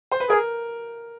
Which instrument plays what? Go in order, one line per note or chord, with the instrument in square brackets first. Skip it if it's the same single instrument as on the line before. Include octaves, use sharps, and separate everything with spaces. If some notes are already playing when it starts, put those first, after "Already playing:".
[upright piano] C5
B4
[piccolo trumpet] G#4 [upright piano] A#4